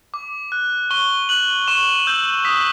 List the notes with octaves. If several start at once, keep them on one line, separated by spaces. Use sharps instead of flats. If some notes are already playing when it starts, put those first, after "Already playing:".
D6
F#6
C#6 G7
F#6 F#7
C#6 E7
E6 G6
D#6 B6